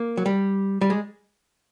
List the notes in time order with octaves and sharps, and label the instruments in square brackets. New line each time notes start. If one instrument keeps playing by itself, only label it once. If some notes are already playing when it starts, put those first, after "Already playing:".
Already playing: [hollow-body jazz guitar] A#3
F#3
G3
G3
G#3